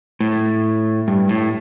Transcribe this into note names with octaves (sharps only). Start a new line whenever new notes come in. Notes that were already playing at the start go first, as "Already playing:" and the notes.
A2
G2
A2